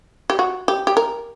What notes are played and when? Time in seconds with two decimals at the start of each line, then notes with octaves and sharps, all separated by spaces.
0.30 G4
0.39 F#4
0.68 G4
0.87 G4
0.97 A#4